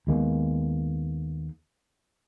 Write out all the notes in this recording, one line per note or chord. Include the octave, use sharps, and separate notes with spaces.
D#2 G#3 A#3 B3